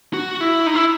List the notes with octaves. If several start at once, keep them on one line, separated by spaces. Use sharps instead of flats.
F#4
E4
D#4
E4